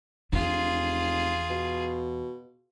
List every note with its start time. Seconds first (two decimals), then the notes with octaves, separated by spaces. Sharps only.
0.32 F1 E2 D4 F4 G#4
1.50 B2